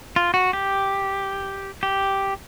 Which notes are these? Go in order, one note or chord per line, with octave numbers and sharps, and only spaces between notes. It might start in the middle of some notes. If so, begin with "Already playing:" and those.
F4
F#4
G4
G4